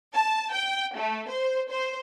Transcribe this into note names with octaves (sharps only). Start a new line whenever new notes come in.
A5
G5
A3
C5
C5